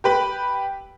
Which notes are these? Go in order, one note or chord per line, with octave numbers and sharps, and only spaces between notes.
G4 B4 B5